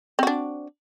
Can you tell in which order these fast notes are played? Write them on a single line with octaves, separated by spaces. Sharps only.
C4 F#4 D4